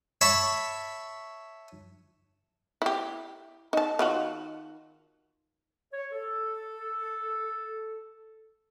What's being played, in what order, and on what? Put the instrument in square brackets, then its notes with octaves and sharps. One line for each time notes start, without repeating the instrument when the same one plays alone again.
[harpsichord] C#5 E5 A5 B5
[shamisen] E4 G4
D#4 A5
D#3 F4 F#4
[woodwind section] C#5
A4